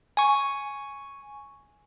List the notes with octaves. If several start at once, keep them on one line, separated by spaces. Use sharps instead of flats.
G#5 C#6